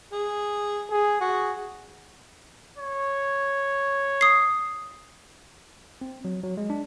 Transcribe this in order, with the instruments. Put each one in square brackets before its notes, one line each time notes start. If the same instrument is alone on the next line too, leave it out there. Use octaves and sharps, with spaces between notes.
[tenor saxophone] G#4
[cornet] G#4
[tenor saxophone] F#4 [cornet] G#4
[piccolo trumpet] C#5
[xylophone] D#6 C7
[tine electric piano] C4
F#3
F#3
G#3
D4